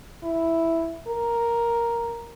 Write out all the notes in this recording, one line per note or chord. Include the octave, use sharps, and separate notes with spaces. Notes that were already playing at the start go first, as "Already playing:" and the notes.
E4
A#4